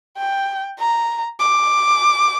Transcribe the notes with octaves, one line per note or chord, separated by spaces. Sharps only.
G5
A#5
D6